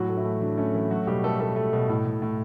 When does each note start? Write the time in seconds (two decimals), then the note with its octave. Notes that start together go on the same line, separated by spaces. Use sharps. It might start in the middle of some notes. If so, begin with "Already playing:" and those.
Already playing: A2 F#3 F#4
0.09 A3
0.17 E3 E4
0.25 A3
0.41 D3 F#3 D4
0.58 A3 C#4
0.74 E3 F#3 E4
0.90 F#3 A3 F#4
1.07 B2 G3 G4
1.24 A3 A4
1.40 A3 A4
1.56 A3
1.73 B2
1.89 A2
2.05 A2
2.22 A2